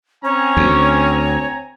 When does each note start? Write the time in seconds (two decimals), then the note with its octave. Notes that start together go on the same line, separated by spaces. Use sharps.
0.24 C4 C#4 C#5 G#5 A#5
0.57 D2